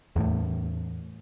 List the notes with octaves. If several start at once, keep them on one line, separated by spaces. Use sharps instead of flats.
E2 A2